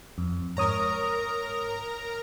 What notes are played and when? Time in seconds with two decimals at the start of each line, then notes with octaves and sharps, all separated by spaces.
0.18 F2
0.57 G#2 A#4 C#5 A#5 D#6